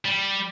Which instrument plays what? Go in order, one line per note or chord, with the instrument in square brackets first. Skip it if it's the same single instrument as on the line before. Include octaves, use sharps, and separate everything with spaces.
[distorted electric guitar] G3